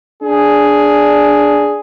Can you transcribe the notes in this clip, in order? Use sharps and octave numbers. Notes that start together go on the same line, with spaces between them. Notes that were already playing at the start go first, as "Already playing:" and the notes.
D4 G#4